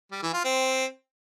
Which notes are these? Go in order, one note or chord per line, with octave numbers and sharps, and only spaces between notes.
G3
E3
F4
C4